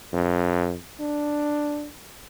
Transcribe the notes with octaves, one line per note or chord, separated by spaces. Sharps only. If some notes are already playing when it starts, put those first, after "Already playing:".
F2
D4